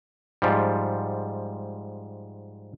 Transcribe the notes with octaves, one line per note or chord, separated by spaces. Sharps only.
G#2 F3 G3